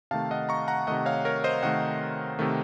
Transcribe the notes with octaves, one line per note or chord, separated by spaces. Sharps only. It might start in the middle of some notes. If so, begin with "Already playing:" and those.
C3 D#3 A3 F5 A5
D#5 F#5
A#5 C#6
F#5 A#5
C3 D#3 A3 D#5 F#5
C#5 F5
A#4 C#5
C5 D#5
C3 D#3 A3 D#5 F#5
C3 D#3 A3